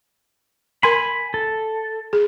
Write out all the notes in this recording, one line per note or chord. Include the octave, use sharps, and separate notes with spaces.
A#4 G#5 B5 C6
A4
G#4